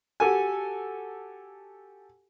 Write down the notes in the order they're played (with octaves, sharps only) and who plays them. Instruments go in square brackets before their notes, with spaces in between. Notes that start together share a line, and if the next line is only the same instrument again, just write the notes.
[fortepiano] F#4 G4 A4 G#5